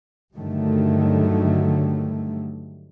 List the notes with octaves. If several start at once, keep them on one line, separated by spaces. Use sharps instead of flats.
G2 D3 D#3 F#3 G3 A3